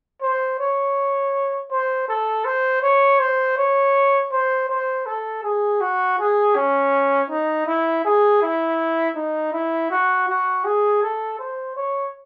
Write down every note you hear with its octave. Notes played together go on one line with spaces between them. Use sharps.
C5
C#5
C5
A4
C5
C#5
C5
C#5
C5
C5
A4
G#4
F#4
G#4
C#4
D#4
E4
G#4
E4
D#4
E4
F#4
F#4
G#4
A4
C5
C#5